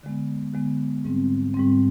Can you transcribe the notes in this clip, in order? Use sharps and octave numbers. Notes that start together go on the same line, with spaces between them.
D3 G#3 B3
D3 G#3 B3
G#2 G3 C4
G#2 G3 C4